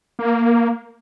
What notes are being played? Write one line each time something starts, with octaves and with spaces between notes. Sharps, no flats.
A#3